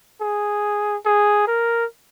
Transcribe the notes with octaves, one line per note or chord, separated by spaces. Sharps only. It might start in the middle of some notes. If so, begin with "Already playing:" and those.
G#4
G#4
A#4